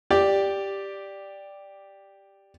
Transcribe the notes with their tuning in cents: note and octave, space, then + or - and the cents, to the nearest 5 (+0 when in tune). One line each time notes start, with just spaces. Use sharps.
G4 +5 D5 +0